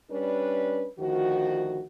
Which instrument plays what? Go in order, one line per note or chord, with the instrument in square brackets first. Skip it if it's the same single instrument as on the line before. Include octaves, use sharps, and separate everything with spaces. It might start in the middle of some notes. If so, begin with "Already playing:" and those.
[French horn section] G3 C#4 D4 B4
D2 D#3 F3 F#4